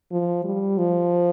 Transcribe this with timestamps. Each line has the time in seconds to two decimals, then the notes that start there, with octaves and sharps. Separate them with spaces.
0.12 F3
0.44 G3
0.78 F3